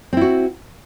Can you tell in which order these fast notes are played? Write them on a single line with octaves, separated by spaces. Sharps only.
C4 E4 F#4